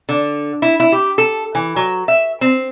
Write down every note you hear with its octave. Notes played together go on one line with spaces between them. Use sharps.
D3
E4
E4
G4
A4
E3
F#3
E5
C4